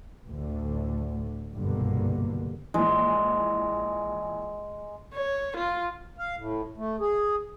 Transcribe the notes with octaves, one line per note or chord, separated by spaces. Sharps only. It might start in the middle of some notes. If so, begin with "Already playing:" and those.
D2 A2 D3
F#1 C2 G2 B2 D3 A#3
A#1 E3 G#3
C#5
F4
F5
A2
A3
G#4